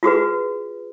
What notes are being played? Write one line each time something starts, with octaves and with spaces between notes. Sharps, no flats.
F4 F#4 G#4 B4